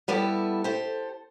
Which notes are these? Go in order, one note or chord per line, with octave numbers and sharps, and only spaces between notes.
G3 B3 E4 G4 A4
G4 A4 C5